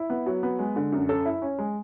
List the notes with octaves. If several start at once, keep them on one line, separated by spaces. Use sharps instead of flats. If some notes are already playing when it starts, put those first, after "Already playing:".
Already playing: E4
B3
F#3
B3
G#3
D3
F#2
A4
E4
C#4
G#3